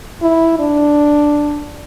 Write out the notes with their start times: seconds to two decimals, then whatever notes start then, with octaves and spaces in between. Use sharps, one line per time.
0.22 E4
0.59 D4